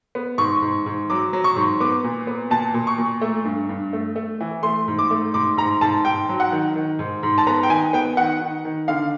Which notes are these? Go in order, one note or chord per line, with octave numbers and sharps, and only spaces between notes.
B3
G#2 C#6
G#2
G#2
F#3 D6
F#3
C#6
G#2
B3 D6
A#2
B3
A#2 A5
A#2
C#6
A#2
A3
G2
G2
A3
A3
E3
A3 C6
G#2
D6
A3
G#2 D6
G#2 A#5
G#2 A5
G#2 G5
F#3
F#5
D#3
D#3
G#2
G#2
A5
B3 A#5
G5
D#3 G#5
B3 G5
D#3 F#5
D#3
D#3
D3 F5